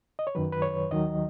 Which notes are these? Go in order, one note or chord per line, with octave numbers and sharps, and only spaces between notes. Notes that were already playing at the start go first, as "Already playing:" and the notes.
D#5
C#5
F#2 D#3 F#3 B4
B4
C#5
D#2 D#3 F#3 D#5